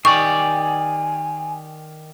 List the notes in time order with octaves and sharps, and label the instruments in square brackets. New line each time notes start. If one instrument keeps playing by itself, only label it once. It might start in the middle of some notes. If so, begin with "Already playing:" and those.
[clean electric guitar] D#3 G4 D5 [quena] G#5 [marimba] C#6